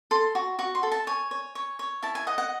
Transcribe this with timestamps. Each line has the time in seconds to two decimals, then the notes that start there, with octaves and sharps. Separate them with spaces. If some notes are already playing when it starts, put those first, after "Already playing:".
0.11 A4 C6
0.35 F#4
0.59 F#4 C#6
0.75 C6
0.83 A4
0.92 A5
1.07 C#5 G#5
1.31 C#5
1.55 C#5
1.79 C#5
2.02 E4 A5
2.15 G#5
2.27 D#5 F#5
2.38 F#5